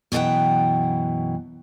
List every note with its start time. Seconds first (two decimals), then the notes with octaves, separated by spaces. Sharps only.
0.12 F#2 B2 E3 A4 F#5 G5